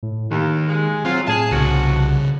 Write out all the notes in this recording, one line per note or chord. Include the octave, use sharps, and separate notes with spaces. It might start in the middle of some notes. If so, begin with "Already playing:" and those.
A2
D#2 D#3
G#3
F#3 C4 F4
A2 G#4 A5
C2 C#3 F3 D4 F#4 C5